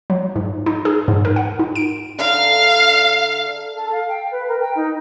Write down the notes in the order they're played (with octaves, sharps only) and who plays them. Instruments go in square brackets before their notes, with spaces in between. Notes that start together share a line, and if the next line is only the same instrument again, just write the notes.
[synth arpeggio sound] F#3
G#2
D#4
G#4
G#2
A#4
F#5
D#4
D7
[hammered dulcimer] D3 E5 A#5 [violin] F5
[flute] A4
F5
G5
B4
A#4
G5
D#4